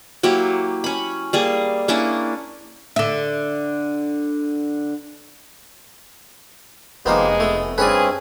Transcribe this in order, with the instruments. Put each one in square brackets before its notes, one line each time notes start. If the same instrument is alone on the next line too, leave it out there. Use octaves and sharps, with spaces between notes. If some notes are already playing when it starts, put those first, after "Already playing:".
[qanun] F#3 A#3 E4 G4
C#4 B5
G3 A#3 G#4
A#3 C#4 D4 E4
[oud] D3 E5
[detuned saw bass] F1 [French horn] G#3 [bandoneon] A#3 G4 C5 [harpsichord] B3 D#4 F5
[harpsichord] A3 [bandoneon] B3
[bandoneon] G2 C4 C#4 [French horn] G#4 [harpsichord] B4 C#5 D5